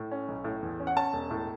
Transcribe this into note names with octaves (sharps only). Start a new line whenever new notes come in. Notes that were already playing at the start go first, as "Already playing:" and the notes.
Already playing: A2
C#4
B1
A2
E2
C#4
F#5
C#4 A5
E1
A2